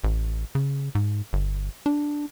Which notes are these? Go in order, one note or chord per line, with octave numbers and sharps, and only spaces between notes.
A1
C#3
G#2
G1
D4